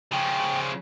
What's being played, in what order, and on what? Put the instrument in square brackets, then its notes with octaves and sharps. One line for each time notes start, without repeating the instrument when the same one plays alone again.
[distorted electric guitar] C#3 F3 [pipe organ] G5